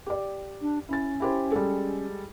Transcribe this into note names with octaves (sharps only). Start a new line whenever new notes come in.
G4 D5
D4
C#4 E4 A6
E4 G4 C5
G3 G#3 A4